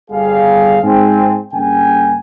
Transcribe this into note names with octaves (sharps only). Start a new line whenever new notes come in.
G1 G3 G#4 F5
G#2 C4 G#5
G2 C#3 A#3 G5 G#5